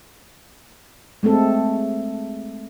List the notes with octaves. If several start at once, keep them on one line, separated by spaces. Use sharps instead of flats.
G#3 A3 C4 A4